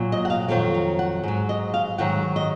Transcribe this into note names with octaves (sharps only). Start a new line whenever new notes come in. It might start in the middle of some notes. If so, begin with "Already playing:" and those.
Already playing: A#2 F#3
D#5
F#5
F5
F2 D#3 F#3 F5
F5
F#5
G#2 F#3
D#5
F5
G#2 D#3 F#3 F#5
D#5